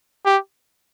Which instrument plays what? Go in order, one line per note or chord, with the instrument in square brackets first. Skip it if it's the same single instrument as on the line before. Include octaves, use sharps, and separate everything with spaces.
[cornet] G4